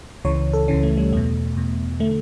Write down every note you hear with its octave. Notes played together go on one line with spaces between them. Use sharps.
C#2 C#3 E3 C#5
A4
C#2 C#3 E3 C#4
A3
G3
E2 B2 A3
E2 B2
D3 A3